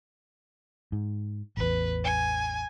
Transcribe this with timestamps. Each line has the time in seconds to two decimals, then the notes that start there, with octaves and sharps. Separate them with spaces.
0.92 G#2
1.57 A1 E2 B4
2.04 G#5